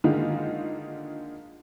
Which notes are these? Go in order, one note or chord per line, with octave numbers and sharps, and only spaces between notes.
D3 D#3 G#3 A#3 D#4 F4